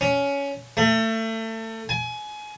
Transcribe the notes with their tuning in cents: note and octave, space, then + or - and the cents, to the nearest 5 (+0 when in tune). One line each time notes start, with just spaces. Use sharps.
C#4 +15
A3 +30
G#5 +25